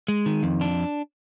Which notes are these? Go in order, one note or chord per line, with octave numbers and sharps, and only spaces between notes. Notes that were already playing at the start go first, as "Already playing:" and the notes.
G#3
D#3
F2
D4